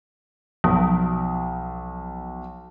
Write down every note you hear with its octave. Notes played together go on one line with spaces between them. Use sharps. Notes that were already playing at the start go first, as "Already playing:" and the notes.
B1 F3